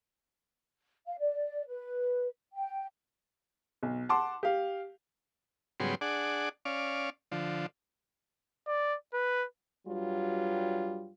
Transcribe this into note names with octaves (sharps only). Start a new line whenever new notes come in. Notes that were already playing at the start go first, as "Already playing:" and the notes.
F5
D5
B4
G5
B1
F#5 A5 C6 D6
G4 F5
G#2 C#3 F#3 G3 B3 C6
D4 G#4 D5 F#5
C#4 D5 F5
D3 F3
D5
B4
G2 F#3 G3 F4